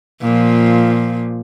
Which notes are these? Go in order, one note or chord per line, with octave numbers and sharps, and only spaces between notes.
A#2 F3